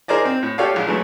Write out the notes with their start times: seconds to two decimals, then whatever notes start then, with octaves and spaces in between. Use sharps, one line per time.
0.08 D#4 G#4 A#4 C5 D5 D#5
0.25 C4
0.43 A2
0.58 F4 G4 A4 C#5 D5 F5
0.74 A#1 G#3
0.87 E3 F#3 G#3 A3 E4